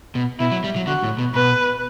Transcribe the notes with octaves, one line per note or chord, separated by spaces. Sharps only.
B2
B2 E4
F#3
G3
F#3
D3 F#4
A2
B2
B2 B4